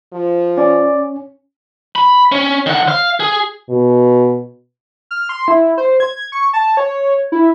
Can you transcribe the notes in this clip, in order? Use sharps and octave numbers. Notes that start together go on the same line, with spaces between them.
F3
C#4 D5
B5
C#4
D#3 F#5
F5
G#4
B2
F6
C6
E4
C5
G#6
C#6
A5
C#5
E4